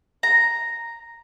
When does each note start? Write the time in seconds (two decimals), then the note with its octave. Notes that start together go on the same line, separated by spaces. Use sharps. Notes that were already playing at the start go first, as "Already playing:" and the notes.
0.23 A#5